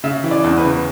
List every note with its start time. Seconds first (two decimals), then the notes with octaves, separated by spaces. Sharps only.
0.04 C#3 E5
0.24 E3
0.31 D5
0.44 E2
0.57 B4
0.65 C#3